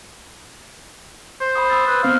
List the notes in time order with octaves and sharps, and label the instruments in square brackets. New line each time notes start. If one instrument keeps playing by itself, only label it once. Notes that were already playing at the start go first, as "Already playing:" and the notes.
[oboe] C5
[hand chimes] B5 C6 D#6
D#6 E6 A6
[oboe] B4
[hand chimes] B3 C4 C5 [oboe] F5